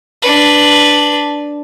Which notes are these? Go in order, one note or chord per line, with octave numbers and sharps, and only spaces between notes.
D4 B4